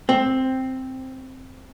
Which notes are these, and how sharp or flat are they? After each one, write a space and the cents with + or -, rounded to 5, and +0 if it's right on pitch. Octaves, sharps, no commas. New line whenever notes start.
C4 +0 G5 +0